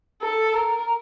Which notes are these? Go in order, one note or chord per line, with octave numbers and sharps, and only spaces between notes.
A4
A#4